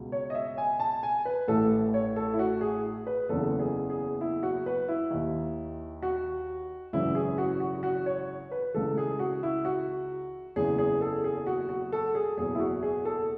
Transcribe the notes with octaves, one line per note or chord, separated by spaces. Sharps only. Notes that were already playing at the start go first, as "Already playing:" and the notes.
Already playing: C#2 B2
C#5
D#5
E5
G#5
A5
G#5
B4
A1 A2 E3 A4
C#5
A4
E4
F#4
G#4
B4
F#1 E2 C#3 E3 A4
G#4
G#4
E4
F#4
B4
E4
D#2 D#3
F#4
G#1 F#2 C#3 E3 E4
G#4
F#4
F#4
F#4
C#5
B4
C#2 C#3 E3 A4
G#4
F#4
E4
F#4
F#1 E2 C#3 E3 G#4
G#4
A4
G#4
F#4
F#4
A4
G#4
F#1 E2 B2 G#4
E4
F#4
G#4
A4